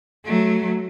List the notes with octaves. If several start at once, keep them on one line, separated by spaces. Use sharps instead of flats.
F#3 A3